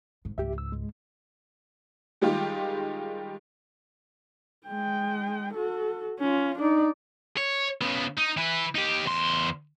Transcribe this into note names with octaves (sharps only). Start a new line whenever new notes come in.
G#2
C#2 G#2 G4 E5
E6
G#3
D#3 G3 G#3 F4 G4
G#3 G5
F#4 A4
C#4 F4
D4 D#4 D5
C#5
C#3 B3
D#4
E3 B4
D#4 G4
E2 C6